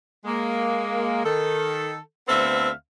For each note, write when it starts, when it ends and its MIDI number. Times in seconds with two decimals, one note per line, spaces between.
0.25 1.20 56
0.25 1.20 58
1.23 1.97 51
1.23 1.97 69
2.28 2.69 38
2.28 2.69 59
2.28 2.69 60
2.28 2.69 69
2.28 2.69 76
2.28 2.69 77